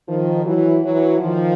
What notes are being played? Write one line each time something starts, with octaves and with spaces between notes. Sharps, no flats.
D#3 F3
E3 F#3
E3 F#3
D#3 F3